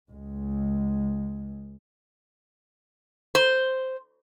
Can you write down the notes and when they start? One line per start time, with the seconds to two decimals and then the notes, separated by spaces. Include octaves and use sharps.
0.12 C#2 G#3
3.35 C5